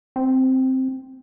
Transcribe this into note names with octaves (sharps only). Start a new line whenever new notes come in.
C4